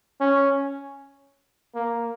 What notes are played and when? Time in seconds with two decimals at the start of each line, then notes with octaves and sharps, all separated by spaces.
0.20 C#4
1.75 A#3